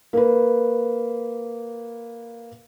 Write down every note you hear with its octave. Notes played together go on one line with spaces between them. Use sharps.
A#3 A#4 B4